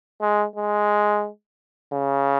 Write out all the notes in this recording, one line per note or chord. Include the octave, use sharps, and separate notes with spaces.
G#3
G#3
C#3